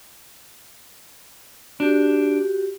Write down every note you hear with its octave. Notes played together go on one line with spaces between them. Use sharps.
D4 F#4 G4